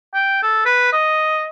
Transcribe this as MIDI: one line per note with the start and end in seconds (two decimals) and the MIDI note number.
0.15 0.41 79
0.43 0.65 69
0.66 0.89 71
0.93 1.48 75